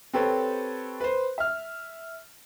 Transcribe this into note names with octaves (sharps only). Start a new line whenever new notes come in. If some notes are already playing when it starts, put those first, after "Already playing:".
C4 G4 A4 B4 C#5
B4 C5
E5 F6